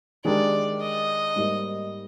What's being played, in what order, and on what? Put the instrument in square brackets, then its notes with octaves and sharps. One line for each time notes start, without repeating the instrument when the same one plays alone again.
[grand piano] D#3 G#3 D4 G4 A#4 [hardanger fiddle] D5
[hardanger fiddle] D#5
[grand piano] G#2 G3 A#3 D#4